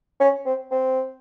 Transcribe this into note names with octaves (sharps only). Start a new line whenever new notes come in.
C#4
C4
C4